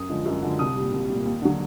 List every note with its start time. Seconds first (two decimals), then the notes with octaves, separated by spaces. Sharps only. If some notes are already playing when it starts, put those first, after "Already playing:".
Already playing: F#2 D#6
0.09 D3 F3 G#3
0.26 F#2
0.42 D3 F3 G#3
0.59 C2 D#6
0.76 A#2 G3
0.92 C2
1.09 A#2 G3
1.26 D#2
1.42 D3 F#3